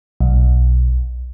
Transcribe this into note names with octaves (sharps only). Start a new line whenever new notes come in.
B1